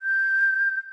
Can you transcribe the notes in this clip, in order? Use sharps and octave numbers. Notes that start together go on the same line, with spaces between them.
G6